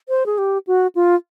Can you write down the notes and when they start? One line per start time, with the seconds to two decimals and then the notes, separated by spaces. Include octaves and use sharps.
0.09 C5
0.26 G#4
0.38 G4
0.67 F#4
0.95 F4